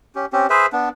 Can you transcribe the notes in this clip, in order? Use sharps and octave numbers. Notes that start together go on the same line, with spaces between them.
C#4 G4
C4 C#4 G4
G#4 B4 C5 E5
B3 D4